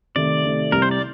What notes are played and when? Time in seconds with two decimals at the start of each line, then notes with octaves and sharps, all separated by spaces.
0.15 C3 D#3 A3 D5
0.44 C3 D#3 A3
0.72 C2 C3 G3 A#4
0.82 C5
0.91 D5